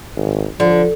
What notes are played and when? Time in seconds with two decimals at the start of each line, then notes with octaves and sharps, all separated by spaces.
0.16 G#1
0.60 D3 F3